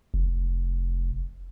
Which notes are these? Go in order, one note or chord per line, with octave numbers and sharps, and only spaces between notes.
F1